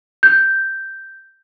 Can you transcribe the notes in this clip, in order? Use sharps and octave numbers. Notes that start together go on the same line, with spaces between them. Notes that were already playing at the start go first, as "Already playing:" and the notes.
G6